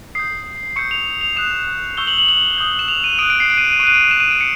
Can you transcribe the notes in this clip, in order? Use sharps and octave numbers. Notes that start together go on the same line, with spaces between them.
D#6 G6 C7
C#6 E6 G6 C#7
F7
F7
D#6 F#6 E7
C#6 E6 G6 G7
F#7
F#7
F#7
D#6 G6
E7
F7
D#7
D#6 F#6 D7
D7
C7
D7
D#7
D7
D#7
C#6 F#6 D7 D#7
D7
E7
D#7
D7
C#7